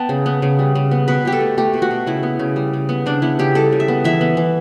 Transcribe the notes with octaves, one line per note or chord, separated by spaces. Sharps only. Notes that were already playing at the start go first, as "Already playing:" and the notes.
Already playing: B3 G5 A5
C#3
B3
C#3
G3
C#3
B3
B2 B4
B2 G4
A4
A3
A3 G4
B2
F#4
B2
C#3 E4
B3
C#3
G3
C#3
B3
C#3 D4
B3 E4
C#3 G4
G3 A4
C#3
E5
B3
E3 E5
B3
E3